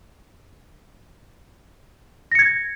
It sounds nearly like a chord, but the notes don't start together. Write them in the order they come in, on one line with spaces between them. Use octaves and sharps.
A#6 C#7 G#6